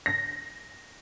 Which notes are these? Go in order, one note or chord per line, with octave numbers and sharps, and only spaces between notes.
A#6